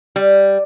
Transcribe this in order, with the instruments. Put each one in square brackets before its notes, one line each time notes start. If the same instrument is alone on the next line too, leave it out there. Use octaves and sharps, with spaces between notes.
[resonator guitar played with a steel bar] G3